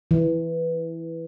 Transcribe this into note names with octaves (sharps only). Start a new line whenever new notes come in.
E3